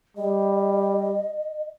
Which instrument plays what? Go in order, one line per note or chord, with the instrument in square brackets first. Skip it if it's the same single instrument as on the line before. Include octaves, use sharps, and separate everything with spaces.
[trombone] G3 [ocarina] D#5